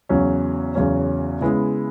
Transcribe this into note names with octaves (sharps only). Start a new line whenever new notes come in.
E2 C#3 F#3 C#4
E2 C#3 F#3 C#4
C#3 G#3 B3 E4